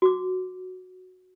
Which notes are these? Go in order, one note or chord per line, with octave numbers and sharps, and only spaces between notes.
F#4 D6